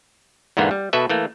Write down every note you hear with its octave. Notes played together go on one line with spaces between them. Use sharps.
E2 G#2 D3 A#3 B3
G3
B2 A4 B4 E5
E3 A3 A#3